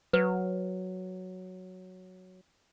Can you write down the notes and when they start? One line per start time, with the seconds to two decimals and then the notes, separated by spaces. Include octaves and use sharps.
0.13 F#3 B4